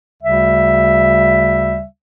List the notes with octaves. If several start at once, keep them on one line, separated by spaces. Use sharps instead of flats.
D2 C#3 G3 E5